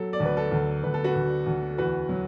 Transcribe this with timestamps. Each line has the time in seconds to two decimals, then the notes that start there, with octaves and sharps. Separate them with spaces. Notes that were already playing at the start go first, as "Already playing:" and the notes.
Already playing: F#3 A4
0.13 D5
0.20 D2
0.25 B4
0.37 A4
0.52 D2
0.84 D2 B4
0.94 A4
1.04 F#4 B4
1.16 D2
1.46 D2
1.78 E2 F#4 B4
2.09 F#3